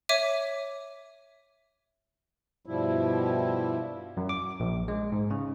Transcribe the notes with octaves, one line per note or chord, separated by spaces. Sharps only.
C#5 E5 D6 D#7
G2 B2 F3 G3 E4
F#2
D6
A#1
G#3
G#2
C#3